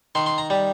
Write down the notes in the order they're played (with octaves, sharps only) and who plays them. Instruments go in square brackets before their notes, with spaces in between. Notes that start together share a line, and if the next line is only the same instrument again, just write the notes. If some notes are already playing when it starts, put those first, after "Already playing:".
[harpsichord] D#3 C6
C6
A#5
G3